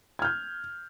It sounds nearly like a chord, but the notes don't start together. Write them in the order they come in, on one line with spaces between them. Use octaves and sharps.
G#6 F6 G6